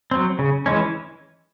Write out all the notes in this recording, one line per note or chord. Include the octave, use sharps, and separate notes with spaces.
F#3 C4
C#3
E3 G#3 C#4